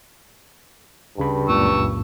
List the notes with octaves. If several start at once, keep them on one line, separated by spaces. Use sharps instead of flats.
D2 G2 C#3 B5
C#2 F#2 A#2 C#6 E6